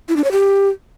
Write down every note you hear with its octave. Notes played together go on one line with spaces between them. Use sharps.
E4
D4
C#5
G4